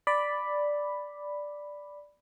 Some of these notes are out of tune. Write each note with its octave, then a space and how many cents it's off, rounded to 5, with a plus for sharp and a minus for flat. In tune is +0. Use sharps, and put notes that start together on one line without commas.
D5 +0 B5 +0